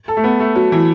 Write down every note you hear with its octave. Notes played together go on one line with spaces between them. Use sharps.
A4
A3
B3
A3
F#3
E3